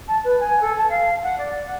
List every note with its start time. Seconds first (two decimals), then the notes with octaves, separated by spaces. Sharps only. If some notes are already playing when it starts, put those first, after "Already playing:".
0.08 A5
0.24 B4
0.40 G#5
0.61 A4
0.77 A5
0.89 F5
1.23 F#5
1.38 D5
1.66 F#5